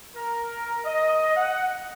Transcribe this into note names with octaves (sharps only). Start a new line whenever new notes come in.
A#4
D#5
F#5